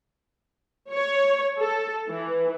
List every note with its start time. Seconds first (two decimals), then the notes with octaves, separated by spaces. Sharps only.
0.91 C#5
1.59 A4
2.09 E3